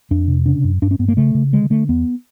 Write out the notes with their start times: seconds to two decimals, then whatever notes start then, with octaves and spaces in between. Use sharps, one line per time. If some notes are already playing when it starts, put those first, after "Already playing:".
0.11 F2 D4
0.28 C3
0.46 C#3 D4
0.64 F#2
0.82 G2 D4
0.91 C#4
0.99 G2 B3
1.08 A#3
1.17 C#3 A3
1.35 C#3
1.53 D3 G#3
1.70 D3 A3
1.89 E2 B3